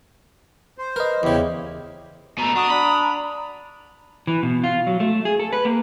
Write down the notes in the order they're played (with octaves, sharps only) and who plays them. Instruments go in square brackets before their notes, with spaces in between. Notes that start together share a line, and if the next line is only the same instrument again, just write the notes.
[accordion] C5
[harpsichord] A#4 [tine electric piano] B4 D#5
[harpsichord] E2 C#3 [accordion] E4 G4
[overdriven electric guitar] B2 A3 [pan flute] A#5
[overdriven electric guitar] D4 [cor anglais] F#4 [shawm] D#6
[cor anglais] D4 [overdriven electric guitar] B5
[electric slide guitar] E3
B2
F4
F#3
A3
G#4
A4
B4
A#3